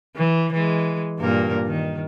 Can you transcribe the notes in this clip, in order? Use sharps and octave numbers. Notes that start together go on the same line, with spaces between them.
E3
E3 G#3
G2 A#2 A#4
D#3